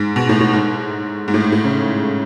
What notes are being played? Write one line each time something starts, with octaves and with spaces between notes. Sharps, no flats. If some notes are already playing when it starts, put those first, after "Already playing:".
Already playing: G#2
B2
A2
A2
G#2
G#2
A2
G#2
A2
C#3